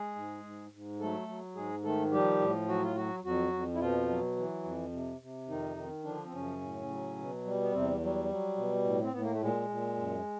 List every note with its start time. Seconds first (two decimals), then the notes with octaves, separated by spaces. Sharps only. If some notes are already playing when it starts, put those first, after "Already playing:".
Already playing: G#3 G#4
0.16 G#2
0.44 G#2
0.72 G#2
1.00 F#3 A3 A4
1.28 F#3
1.55 G#2 G#3 G#4
1.84 D#3 A3 A4
2.11 F3 G3 G4
2.40 A2
2.68 F#3 F#4
2.82 F4
2.96 F#3 F#4
3.24 F2 F#3 F#4
3.53 F2
3.74 E4
3.80 B2 F3 F4
4.08 F#3
4.36 E3
4.64 F2
4.92 C3
5.21 C3
5.48 F2 D#3 D#4
5.76 D#3
6.04 D3 F3 D4
6.25 C4
6.32 F#2 C#3 C#4
6.61 A2
6.89 F#3
7.17 B2
7.45 G3
7.61 B3
7.72 E2 C3 C4
8.01 F#3 G3
8.29 F#3
8.56 B2
8.85 A2
9.02 C4
9.11 A2 B3
9.21 A#3
9.31 A3
9.41 A#2 G#3
9.69 A#2
9.97 F#2